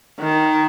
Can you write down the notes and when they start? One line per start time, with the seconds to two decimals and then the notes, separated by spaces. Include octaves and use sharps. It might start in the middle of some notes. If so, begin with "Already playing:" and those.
0.20 D#3